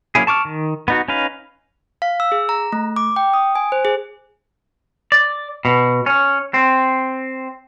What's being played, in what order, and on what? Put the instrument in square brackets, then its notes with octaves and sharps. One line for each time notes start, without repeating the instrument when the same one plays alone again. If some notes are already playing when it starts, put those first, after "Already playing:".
[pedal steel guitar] F#3 A#3 C#4 E4 G#4
A5 C#6 D6 F6
D#3
B3 D#4 F#4
C#4 D#4 B4 F5
[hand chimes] F5
E6
G#4
A#5
A3
D6
G5
D#6
G#5
C5
G#4
[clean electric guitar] D5
B2
C#4
C4